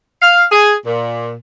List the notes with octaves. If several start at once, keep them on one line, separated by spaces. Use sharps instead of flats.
F5
G#4
A#2